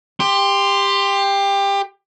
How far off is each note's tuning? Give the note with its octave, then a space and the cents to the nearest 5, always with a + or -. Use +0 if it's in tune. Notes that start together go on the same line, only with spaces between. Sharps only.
G4 +20 C6 +0